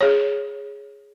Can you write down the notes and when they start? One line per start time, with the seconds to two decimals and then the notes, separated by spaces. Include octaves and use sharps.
0.01 G#4 C#5